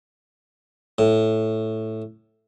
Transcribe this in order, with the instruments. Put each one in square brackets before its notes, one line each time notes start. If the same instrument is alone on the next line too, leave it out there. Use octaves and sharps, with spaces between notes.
[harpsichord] A2